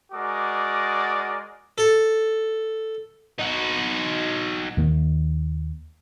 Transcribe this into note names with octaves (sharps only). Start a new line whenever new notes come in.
G#3 F#4 A#4 D5 D6 D#6
A4
D#4 F#4
D#2 D#3 A#3